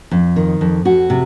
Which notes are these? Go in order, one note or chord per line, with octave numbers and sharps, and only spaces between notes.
F2
D#3
F2
F2 F#4
C3